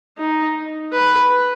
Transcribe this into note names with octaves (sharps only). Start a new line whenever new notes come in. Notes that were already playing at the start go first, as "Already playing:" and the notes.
D#4
B4